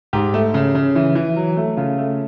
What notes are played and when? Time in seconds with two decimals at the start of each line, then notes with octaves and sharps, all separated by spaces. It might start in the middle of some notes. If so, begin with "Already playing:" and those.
0.13 G#2 G4
0.34 A3
0.54 C#3
0.75 C#3
0.95 E3
1.15 E3
1.36 F#3
1.57 A3
1.77 C#3 F4
1.98 A3